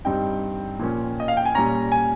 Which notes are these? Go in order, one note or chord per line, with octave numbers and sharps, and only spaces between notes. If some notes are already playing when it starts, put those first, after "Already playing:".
G2 G3 C4 D#4 G5
A#2 F3 A#3 C#4
D#5
F5
G5
G#5
A#2 G3 C#4 A#5
G#5